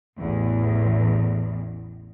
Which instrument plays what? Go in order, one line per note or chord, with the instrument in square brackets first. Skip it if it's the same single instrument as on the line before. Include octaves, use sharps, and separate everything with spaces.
[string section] A1 E2